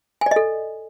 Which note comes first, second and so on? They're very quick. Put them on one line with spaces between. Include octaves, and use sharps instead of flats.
G#5 D5 D#5 A4